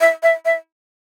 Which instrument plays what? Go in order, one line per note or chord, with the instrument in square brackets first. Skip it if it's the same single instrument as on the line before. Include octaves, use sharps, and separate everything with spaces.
[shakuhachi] E5
E5
E5